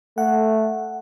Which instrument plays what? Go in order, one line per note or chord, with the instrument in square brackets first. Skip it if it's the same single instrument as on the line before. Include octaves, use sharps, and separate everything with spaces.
[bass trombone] A3 [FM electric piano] F#5